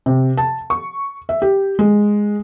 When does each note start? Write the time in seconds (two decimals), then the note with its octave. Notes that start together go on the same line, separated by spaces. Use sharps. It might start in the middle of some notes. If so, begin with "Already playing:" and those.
0.06 C3
0.38 A5
0.70 C#6
1.29 E5
1.42 G4
1.79 G#3